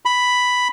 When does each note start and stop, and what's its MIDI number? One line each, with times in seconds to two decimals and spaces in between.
0.05 0.68 83